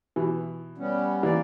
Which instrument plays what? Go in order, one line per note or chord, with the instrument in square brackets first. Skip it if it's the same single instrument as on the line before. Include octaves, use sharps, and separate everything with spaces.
[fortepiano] B2 E3
[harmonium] G3 B3 C#4
[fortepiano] E3 A#3 [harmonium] D5